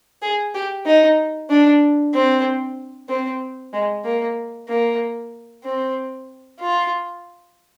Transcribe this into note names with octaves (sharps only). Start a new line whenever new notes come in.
G#4
G4
D#4
D4
C4
C4
G#3
A#3
A#3
C4
F4